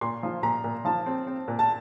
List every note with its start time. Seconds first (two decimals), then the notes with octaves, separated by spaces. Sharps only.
0.01 A#2 C6
0.23 F3
0.43 A#2 A#5
0.64 A#2
0.85 F3 A5
1.06 C4
1.27 C4
1.48 A#2
1.59 A5